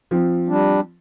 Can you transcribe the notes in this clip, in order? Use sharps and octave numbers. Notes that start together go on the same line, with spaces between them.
F3 C4
G3 D4